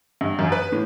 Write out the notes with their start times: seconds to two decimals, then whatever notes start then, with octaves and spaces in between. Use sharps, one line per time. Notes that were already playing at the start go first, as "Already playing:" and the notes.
0.21 G2
0.39 F#2
0.52 B4
0.72 A2